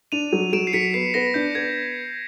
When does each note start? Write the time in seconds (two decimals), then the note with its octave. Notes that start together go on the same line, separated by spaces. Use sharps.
0.12 D4 D#7 F7
0.33 F#3
0.53 F#3 D7 E7
0.67 C7
0.73 F#3 B6 C#7
0.94 B3 C7
1.14 B3 A#6
1.34 D4 G6
1.55 B3 G#6